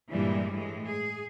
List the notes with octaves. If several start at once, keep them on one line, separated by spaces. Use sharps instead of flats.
G2 A#2 E3 G3 G#3 E4
A2 E3 G#3
G#4